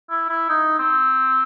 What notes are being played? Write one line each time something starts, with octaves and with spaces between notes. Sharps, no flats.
E4
E4
D#4
C4